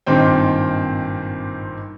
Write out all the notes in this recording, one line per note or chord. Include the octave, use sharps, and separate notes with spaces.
G#1 G2 A#2 D#3 C4 G5